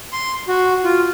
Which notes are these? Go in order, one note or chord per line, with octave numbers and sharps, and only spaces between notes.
C6
F#4
F4